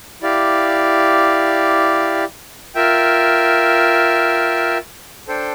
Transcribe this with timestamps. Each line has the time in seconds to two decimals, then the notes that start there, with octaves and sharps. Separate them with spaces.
0.22 E4 G4 D5 F5
2.75 F4 A#4 E5 G5
5.28 D4 A4 C5 G5